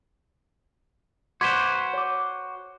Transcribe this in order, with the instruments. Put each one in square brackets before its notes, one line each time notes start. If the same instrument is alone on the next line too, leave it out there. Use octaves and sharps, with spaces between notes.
[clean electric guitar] F#4 B4 C5 [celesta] C6 D6 G#6
[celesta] C#5 D6